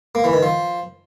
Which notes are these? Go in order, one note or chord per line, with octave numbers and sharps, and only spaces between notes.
A#3
E3
D#3
F3